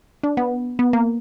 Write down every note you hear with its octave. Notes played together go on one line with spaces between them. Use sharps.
D4
B3
B3
A#3